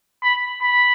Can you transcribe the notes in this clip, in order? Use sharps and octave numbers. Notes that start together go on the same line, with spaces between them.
B5
B5